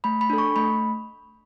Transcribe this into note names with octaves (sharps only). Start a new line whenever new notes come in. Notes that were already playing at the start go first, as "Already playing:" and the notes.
A3 B5
B5
D4 A4
C#6
A3 B5